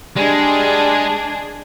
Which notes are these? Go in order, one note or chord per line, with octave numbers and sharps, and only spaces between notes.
G3 G#3 D4 G#4